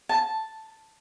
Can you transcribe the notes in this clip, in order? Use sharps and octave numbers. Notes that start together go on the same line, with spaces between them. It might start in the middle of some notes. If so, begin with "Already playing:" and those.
A5